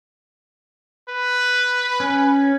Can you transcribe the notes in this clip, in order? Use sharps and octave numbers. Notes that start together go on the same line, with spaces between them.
B4
C#4